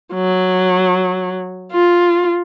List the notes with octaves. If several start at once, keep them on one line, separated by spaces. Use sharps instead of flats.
F#3
F4